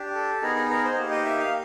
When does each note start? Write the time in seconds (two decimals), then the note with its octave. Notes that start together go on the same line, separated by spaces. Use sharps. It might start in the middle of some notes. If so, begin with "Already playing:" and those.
Already playing: D4 G4
0.15 A4
0.42 B3 D#4 G#4 A#4
0.55 A#4
0.70 A#4
0.84 C5
0.97 A#3 D#4 G4
1.11 D#5
1.25 E5
1.39 F5